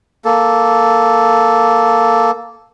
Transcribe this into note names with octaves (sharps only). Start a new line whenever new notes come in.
A#3 A4